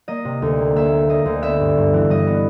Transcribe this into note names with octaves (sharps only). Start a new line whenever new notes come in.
A#3 D#5
C3
D2
A#3
A#3 E5
A#3
A#3 D#5
D2
B3 E5
G2
G2
E3
G2 D#5
B3